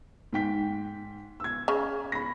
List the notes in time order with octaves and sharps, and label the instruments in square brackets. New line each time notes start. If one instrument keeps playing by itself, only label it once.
[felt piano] G#2 G5 B6
E6 G#6
[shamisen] C#3
[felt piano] B5 A#6